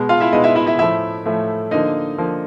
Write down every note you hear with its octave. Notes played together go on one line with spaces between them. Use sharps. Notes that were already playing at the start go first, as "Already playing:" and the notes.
Already playing: B2 G#3 B3
F4 F5
E4 E5
B2 G#3 B3 D#4 D#5
E4 E5
E4 E5
E4 E5
A2 F3 A3 E4 E5
A2 F3 A3
D3 F3 A#3 D#4 D#5
D3 F3 A#3